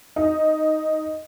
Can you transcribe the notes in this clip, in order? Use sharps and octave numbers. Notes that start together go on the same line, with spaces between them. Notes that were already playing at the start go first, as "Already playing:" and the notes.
D#4